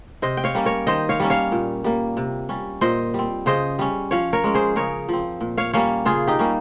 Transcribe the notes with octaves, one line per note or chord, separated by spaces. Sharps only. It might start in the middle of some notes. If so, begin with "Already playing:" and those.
C3 C5 D#5
G5
C#5 F5
G3 A#3 C#4
A#4 C#5
D#3 C5 D#5
C#5 F5
G3 A#3 C#4
C#5 F5
A#2
G3 A#3
C3
G3 C#4
A#2 C5 D#5
G3 C4
C#3 C5 D#5
G3 C#4
F3 C#5 F5
A#4 C#5
G#3 C#4
G#4 C5
C#3 A#4 C#5
F3 C4
A#2
C#5 F5
G3 A#3 C#4 C#5 F5
C#3 F4 G#4
D#4 G4
G3 A#3 C#4